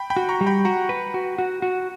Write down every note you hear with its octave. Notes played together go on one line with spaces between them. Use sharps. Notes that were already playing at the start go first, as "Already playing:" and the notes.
Already playing: G5 B5
G5 B5
F#4
A#5 C#6
G3
G5 B5
F#4 F#5 A#5
B4
F#4
F#4
F#4